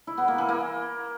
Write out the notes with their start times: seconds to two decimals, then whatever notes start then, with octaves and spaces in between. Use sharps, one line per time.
0.07 E4
0.18 B3
0.28 A#3
0.38 E3
0.49 A#3